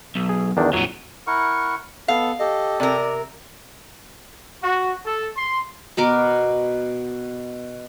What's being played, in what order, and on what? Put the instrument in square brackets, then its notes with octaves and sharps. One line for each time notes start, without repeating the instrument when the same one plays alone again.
[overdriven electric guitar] B1
[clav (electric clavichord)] G#4
E2 D#3 D4
[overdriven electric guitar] F2 A#2 [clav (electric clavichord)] F#3
[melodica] E4 A#4 F#5 C#6
[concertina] B3 A4 [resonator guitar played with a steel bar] F5
[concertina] G4 A4 [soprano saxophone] D#5
[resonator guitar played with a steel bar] C3 A#4 [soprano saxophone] D5
[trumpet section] F#4
A4
C6
[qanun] B2 B3 A#4 D6